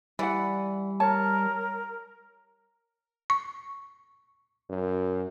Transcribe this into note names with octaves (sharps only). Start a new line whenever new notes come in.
E3 G3 D5 F#5
A#4 C#5 A5
C#6
F#2